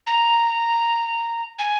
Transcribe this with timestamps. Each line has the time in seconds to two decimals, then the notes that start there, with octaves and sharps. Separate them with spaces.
0.07 A#5
1.59 G#5